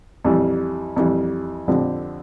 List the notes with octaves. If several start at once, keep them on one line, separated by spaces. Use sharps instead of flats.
F2 E3 G3
F2 E3 G3
F2 D3 F3 C4 G4